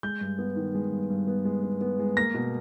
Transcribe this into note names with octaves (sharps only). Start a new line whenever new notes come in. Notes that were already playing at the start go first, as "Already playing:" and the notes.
G#3 G6
G2
B3
D#3
G#3
G2
G2
B3
G#3
B3
B3
G#3
A#3 A#6
B2